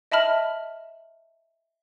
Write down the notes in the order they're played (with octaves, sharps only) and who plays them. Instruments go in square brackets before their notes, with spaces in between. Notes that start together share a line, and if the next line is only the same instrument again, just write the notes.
[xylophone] D#5 E5 A5 B5 F6